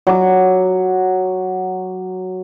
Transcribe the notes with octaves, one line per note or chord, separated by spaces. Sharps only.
F#3 D6